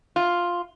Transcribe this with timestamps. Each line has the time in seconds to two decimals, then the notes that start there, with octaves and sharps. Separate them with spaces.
0.16 F4